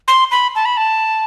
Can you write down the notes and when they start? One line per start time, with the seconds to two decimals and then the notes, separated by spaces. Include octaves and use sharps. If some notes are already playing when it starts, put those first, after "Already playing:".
0.08 C6
0.31 B5
0.55 A5
0.65 B5
0.77 A5